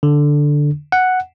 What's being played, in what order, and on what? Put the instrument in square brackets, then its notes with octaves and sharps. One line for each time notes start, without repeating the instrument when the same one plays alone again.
[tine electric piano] D3
F#5